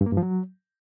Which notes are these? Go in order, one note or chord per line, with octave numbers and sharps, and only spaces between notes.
G2
A#3
G2
F3
F#3